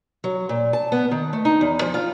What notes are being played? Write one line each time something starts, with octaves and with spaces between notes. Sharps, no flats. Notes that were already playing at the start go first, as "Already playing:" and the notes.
F#3
A#2
A5
B3
D#3
A3
D#4
E2
F3
F4